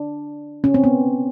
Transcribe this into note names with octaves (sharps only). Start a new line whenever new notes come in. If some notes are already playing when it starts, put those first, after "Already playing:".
Already playing: D4
C#4
C4
B3